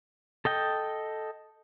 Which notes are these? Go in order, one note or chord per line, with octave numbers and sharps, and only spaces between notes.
A4 D#5 G5